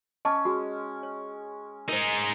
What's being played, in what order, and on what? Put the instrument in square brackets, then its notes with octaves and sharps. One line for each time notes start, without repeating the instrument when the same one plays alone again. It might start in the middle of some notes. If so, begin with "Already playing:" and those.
[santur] C#4 [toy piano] D#5 A5 D6
[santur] G#3 [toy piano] F#4
[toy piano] C#5
[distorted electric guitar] G#3 D#4 [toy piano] A#4 C5